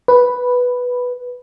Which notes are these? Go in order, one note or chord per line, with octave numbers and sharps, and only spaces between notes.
B4